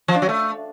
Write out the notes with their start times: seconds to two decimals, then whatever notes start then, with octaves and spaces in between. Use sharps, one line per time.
0.08 F3
0.15 D4
0.22 F#3
0.29 A3